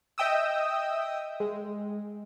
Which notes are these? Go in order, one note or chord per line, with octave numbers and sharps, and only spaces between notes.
D#5 E5 G5 D#6 E6
G#3